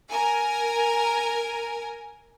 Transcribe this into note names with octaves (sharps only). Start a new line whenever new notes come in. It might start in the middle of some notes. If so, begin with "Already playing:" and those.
A#4 G#5